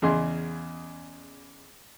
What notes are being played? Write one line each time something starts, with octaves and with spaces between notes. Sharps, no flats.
E2 C#3 G#4 D#5 C6